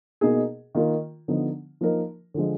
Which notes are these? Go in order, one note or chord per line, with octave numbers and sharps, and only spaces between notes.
B2 A#3 D#4 G#4
D#3 A#3 F4 A#4
D3 F3 B3 D#4
F3 A#3 D#4 A#4
D3 F3 G#3